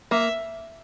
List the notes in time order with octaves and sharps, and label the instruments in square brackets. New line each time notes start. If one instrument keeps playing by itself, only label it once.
[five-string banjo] A#3 [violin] E5